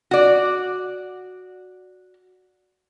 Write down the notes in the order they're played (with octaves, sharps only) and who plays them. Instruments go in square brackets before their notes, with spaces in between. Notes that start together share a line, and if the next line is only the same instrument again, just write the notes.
[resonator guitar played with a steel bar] F#4 D5